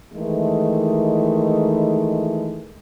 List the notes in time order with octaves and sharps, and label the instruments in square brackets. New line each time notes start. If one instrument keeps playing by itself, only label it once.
[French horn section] D#3 E3 G#3 A3